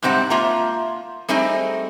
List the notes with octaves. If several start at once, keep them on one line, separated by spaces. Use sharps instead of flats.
G#2 C3 G3 C4 F#5
A#3 F4 E5 A#5
G3 A3 C4 D#4 G#4 D#5